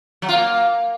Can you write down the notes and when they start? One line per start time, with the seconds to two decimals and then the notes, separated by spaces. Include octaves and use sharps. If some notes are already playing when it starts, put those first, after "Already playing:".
0.22 F#3
0.29 F4
0.35 A#3